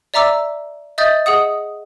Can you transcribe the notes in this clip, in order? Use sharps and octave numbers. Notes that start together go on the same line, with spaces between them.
D5 E5 A#5 D6 E6
D#5 E5 D#6 G6 A6
G#4 D#5 F#5 D#6